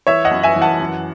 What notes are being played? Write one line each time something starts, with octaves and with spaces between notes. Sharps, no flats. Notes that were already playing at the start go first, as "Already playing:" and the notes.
E3 C#5 E5
D#5 F#5
F#2
E5 G#5
E3
F#5 A5
F#2